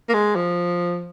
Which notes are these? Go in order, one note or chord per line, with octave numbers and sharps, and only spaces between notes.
A#3
G#3
F3